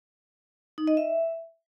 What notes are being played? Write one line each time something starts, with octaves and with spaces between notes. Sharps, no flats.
D#4
D#5
E5